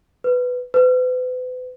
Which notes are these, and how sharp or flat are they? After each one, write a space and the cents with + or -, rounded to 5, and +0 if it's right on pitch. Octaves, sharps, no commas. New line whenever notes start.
B4 +10
B4 +40